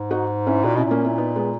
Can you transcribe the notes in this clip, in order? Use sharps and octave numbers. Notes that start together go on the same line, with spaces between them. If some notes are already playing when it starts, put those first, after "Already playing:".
Already playing: G#2
D#4 F#4
C#4 E4
A#2 D#4 F#4
B2 C#4 E4
A#2
A#3 C#4
C#4 E4
B3 D#4
G#3 B3